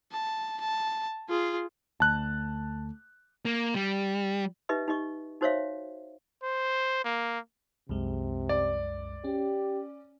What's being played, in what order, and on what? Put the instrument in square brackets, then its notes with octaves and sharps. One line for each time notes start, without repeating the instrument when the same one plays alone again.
[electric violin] A5
A5
F4 G#4
[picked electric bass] D2 [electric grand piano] A5 F#6
[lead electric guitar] A#3
G3
[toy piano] D#4 G4 B4 D#5 E5
D#4 G4 D#5 C#6
D#4 F#4 C5 C#5 E5 F5
[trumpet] C5
A#3
[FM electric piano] C2 F#2 G#3 [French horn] C3
[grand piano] D5
[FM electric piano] C#4 [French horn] G4